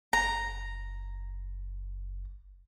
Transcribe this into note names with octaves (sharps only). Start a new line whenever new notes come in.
F#1 A#5